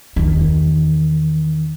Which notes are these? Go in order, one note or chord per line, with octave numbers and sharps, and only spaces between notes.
E2 D#3